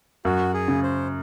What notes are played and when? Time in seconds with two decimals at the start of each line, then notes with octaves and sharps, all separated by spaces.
0.25 F#2 F#4
0.54 G#4
0.68 C#3
0.83 C5